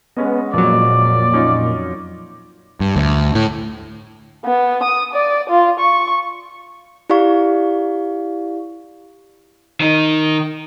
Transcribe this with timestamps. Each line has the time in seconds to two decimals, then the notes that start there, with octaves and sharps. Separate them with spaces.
0.17 G#3 B3 C#4 D#5
0.54 F2 A#2 F#3 D5
1.33 C#4 D#4 F4
2.80 G2
2.96 D2
3.35 A2
4.45 B3
4.83 D#6
5.14 D5
5.50 F4
5.80 C#6
7.10 E4 G4 D5 F5 C#6
9.81 D#3 D#4